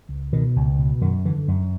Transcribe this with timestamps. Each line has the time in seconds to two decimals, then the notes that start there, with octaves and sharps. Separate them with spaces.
0.09 C#2
0.33 B2 D#3
0.56 C#2
0.78 B2
1.01 F#2 D#3
1.25 D3 E3
1.48 F#2